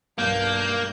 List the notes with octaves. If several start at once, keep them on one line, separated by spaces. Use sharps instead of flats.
B1 G2 A#3 G6